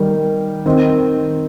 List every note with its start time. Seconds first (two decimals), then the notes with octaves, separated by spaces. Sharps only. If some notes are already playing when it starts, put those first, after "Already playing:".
Already playing: D#3 G3 D#4 A#4
0.66 D#3 C4 D#4